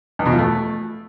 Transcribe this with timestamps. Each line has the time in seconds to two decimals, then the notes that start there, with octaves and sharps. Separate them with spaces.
0.19 E2
0.26 B2
0.32 F3
0.38 A3